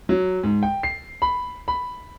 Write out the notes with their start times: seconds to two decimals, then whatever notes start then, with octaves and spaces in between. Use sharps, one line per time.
0.09 F#3
0.43 G#2
0.63 G5
0.83 C7
1.22 B5
1.68 B5